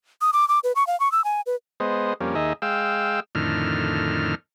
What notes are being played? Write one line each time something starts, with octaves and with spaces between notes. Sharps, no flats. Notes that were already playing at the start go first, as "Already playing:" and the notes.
D#6
D6
D6
B4
C#6
F5
C#6
E6
G#5
B4
G#3 B3 C5 D#5
F2 G3 A#3 C#4
D#2 D#4 G#4 D#5 E5
G#3 F5 G5 E6
F2 A2 D3 D#3 F6